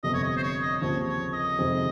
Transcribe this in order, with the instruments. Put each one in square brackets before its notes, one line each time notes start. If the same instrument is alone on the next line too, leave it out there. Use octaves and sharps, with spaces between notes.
[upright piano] G1 F2 C3 [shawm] D#5
[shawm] C#5
D#5
C5
C#5
D#5
[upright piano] D#2 C#3 F3 C4 [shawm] C#5
[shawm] C#5
D#5
[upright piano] F2 C3 D#3 G#3 C4